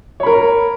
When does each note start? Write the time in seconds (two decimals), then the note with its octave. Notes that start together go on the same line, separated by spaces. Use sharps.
0.20 C#5
0.23 B5
0.26 A#4